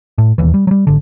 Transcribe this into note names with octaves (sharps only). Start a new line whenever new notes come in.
A2
E1 D#2 E3
G3
F#3 G3
G#1 D3